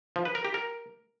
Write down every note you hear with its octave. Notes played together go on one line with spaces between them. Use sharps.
F3
B4
A#4
G4
A#4